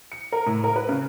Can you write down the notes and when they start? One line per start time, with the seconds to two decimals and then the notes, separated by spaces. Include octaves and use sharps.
0.12 C#7
0.32 A#4
0.46 A2
0.64 A#4
0.76 B4
0.89 C#3